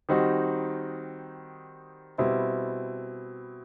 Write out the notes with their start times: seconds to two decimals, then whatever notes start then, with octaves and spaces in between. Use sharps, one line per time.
0.09 D#3 G3 C4 D#4 F#4
2.18 B2 G3 C4 E4